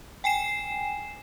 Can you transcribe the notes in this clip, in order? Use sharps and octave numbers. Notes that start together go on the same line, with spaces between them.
G5 G#5 C7 E7